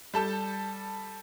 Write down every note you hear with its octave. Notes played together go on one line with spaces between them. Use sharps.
G3 A4 A5 G6